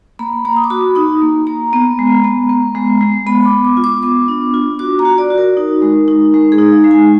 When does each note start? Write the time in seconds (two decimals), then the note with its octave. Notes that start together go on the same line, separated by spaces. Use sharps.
0.19 A#3 B5
0.45 A#3 A#5
0.56 D#6
0.64 D6
0.70 F#4 B5
0.96 D#4 D#6
1.22 A#3
1.47 A#3 A#5
1.73 B3
1.99 G#3
2.24 B3
2.49 B3
2.75 G#3
3.01 G#3
3.27 B3 B5
3.45 D6
3.52 B3
3.65 D6
3.77 F4
3.84 D6
4.03 B3 D6
4.28 D4
4.54 F4
4.79 F#4 D6
4.99 A#5
5.05 F#4
5.18 D5
5.30 F#4
5.38 A#4
5.57 D#4
5.82 G#3
6.08 D#4
6.34 G#3
6.52 G#4
6.58 D#4
6.72 F5
6.84 G#3
6.91 G#5